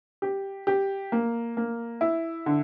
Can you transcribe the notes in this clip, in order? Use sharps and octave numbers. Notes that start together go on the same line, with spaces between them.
G4
G4
A#3
A#3
E4
D3